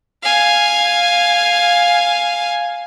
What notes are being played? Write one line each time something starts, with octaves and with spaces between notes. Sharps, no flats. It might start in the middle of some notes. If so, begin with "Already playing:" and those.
F5 G#5